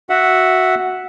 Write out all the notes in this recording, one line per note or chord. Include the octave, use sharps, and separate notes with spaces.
F#4 E5 F#5